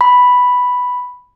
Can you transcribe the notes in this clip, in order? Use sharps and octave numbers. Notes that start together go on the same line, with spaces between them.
B5